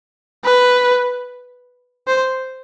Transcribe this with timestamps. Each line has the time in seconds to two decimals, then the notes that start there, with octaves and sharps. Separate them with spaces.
0.44 B4
2.07 C5